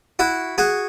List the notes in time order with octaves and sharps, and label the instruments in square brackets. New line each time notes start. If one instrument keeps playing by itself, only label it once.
[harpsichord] E4 F#4
F#4 G#4